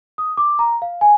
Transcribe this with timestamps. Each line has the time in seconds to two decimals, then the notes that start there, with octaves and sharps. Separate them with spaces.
0.18 D#6
0.37 D6
0.59 A#5
0.82 F5
1.01 G#5